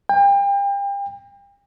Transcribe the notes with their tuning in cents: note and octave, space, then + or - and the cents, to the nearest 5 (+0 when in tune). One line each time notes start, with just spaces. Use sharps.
G5 +35